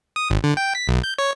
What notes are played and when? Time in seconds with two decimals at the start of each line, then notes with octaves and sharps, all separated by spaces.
0.16 D#6
0.30 G#1
0.44 D3
0.57 G5
0.75 B6
0.88 B1
1.04 G6
1.18 C#5